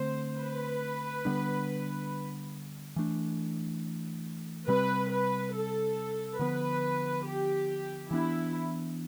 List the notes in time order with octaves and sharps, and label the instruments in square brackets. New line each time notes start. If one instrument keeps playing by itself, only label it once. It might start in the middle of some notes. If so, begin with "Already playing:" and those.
Already playing: [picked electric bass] D3 A3 C4 [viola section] C5
[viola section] B4
[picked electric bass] D3 G3 B3 D4
E3 A3 D4
[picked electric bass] C3 G3 C4 [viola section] B4
[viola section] B4
A4
[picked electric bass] D3 F3 B3 [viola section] B4
[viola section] G4
[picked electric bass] E3 B3 D4 [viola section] E4